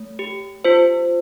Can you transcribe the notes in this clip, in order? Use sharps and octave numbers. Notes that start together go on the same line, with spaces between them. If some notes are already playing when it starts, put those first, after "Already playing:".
Already playing: A3
G4
F4 C5